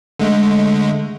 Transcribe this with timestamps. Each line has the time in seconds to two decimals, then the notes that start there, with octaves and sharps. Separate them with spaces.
0.19 D3 G#3 A3